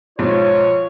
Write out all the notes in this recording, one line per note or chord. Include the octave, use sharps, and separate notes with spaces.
B1 G#2 F3 F4 C#5